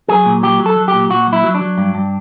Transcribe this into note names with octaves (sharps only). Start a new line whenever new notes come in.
F#3 G#4
A#2
F#3 G4
F#3
A4
F#3
G4
A#2
A#2 F#4
F#3
E4
F#3
D4
F#3
G2
G2